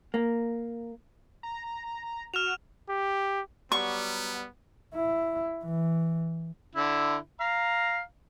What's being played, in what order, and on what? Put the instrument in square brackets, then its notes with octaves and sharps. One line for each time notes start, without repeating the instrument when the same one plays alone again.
[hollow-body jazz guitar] A#3
[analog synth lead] A#5
[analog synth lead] F#4 [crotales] F6 E7 F7
[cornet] G4
[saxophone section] F#3 G3 [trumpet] B3 [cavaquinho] C#6
[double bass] E4
E3
[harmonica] D3 E4
F5 A#5